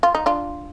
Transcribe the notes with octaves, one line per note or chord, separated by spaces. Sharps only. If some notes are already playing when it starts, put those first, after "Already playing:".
F4
D#4
D4 F4